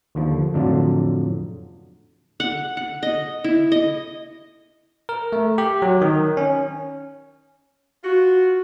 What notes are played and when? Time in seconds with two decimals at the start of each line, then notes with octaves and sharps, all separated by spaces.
0.15 D#2 D3 F3
0.54 F2 A2 D3 F#3 D4 F4
2.40 F#5
2.77 F#5
3.03 D#5
3.44 E4
3.72 D#5
5.09 A#4
5.32 A3
5.58 G4
5.82 F#3
6.01 D#3
6.37 C#4
8.03 F4 F#4